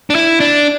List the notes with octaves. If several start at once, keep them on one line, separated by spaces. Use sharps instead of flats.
D4
E4
D4